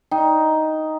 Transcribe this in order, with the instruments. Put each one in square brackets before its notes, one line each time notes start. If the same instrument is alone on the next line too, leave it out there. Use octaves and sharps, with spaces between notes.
[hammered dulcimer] D#4 [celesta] G5